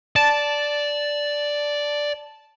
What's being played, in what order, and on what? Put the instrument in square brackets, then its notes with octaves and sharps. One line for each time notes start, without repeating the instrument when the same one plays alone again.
[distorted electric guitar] D5 [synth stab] A5